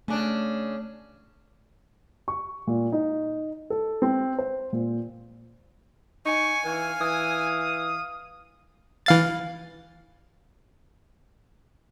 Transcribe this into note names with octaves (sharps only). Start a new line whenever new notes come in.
C#3 A3 D4
C#6
A#2
D#4
A4
C4
C5
A#2
D#4 G#5 C#6
E3 F5
E3 D#6
E3 F5 A6